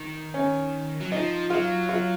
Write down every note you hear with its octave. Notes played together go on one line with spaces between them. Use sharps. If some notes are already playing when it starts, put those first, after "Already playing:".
Already playing: D#3
C#4
F#3
F3 D#4
F#3 F4
F4